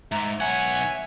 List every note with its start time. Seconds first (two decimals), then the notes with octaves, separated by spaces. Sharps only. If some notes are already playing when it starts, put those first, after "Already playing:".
0.12 G#2 E5 A#5
0.40 B1 C#5 E5 F#5 G#5